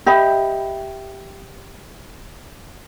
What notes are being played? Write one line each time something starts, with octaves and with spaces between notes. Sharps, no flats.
G4 D#5 E5 B5